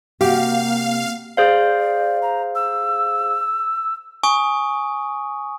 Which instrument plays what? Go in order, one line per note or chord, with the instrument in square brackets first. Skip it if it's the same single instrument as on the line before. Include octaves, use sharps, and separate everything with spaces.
[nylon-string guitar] C3 F#4 [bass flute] A#3 [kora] G4 [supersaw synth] F5
[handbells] G#4 C5 F5 [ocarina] D5
[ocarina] A#5
E6
[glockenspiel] G#5 C#6 D#6